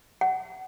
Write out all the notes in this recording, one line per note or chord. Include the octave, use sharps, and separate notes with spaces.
F#5